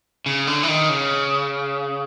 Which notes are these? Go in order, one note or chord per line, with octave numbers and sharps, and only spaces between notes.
C#3
D3
E3
D#3
C#3